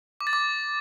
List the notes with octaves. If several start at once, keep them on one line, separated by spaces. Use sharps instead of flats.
D6
A6
D6